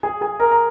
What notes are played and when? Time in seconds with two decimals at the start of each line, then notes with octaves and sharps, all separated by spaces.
0.03 G#4 G#5
0.21 G#4 G#5
0.40 A#4 A#5
0.51 A#5